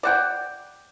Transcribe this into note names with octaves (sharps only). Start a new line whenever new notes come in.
D5 F#5 G5